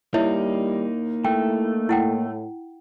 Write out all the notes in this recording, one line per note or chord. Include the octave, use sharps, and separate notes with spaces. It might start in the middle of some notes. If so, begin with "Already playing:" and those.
G3 A#3 D#4 E4 C#5 E5
A3 E4 G5
A2 E4 F#5 G5